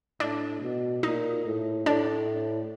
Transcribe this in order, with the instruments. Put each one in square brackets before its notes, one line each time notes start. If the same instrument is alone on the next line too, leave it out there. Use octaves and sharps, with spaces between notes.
[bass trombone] A2 [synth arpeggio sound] D4
[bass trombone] B2
[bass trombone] A#2 [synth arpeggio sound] D#4
[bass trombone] A2
[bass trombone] A2 [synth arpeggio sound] D4